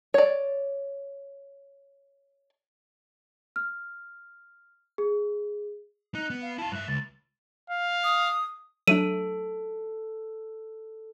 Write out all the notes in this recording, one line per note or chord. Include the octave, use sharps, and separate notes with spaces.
C#5 D5
F6
G#4
D#4 F#6
B3
F5
E4 F5 A5
G2 E5 F#6
C#2 A6
F5
D#6
F#3 A3 D4 A4 D#7